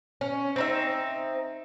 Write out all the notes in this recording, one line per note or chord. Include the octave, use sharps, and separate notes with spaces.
C#4
C4 D#4 E5